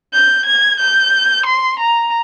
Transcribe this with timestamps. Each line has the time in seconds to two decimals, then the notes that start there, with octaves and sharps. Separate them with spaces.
0.13 G6
0.46 G#6
0.80 G6
1.46 C6
1.80 A#5